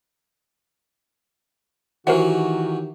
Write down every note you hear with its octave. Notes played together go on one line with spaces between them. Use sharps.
D#3 E3 F#3 F#4 G4 A#4 C5 F#5